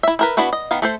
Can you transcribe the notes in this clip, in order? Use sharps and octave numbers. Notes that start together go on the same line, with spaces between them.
E4 E5
E4 A#4 B4
B3 D4 E4 F#4 B4
D#5
D#3 B3 F5
A3 A4 C5